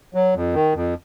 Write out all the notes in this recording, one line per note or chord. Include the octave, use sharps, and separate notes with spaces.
F#3
F2
D#3
F2